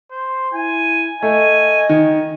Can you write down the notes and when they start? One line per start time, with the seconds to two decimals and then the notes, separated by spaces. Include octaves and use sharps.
0.11 C5
0.54 E4 G#5
1.23 A3 D#5 G#5
1.89 D#3